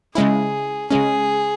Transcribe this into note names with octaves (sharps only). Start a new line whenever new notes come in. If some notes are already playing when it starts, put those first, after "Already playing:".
C#3 G#3 C#4 E4 G#4
C#3 G#3 C#4 G#4